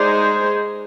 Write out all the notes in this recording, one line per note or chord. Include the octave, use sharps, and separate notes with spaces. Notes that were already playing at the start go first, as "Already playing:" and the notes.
Already playing: G#3 D#4 G#4 C5 D5